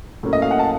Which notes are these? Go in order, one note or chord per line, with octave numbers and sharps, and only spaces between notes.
A2 F#3 A#3 C#4
D#5
F5
F#5
A5